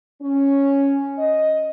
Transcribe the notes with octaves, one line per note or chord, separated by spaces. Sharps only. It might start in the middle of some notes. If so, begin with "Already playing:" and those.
C#4
D#5